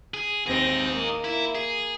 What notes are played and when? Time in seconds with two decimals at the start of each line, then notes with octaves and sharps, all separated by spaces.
0.14 G#4
0.46 D#2 C4 D#4 G#4 A#6
0.92 A#3
1.24 E4
1.55 G#4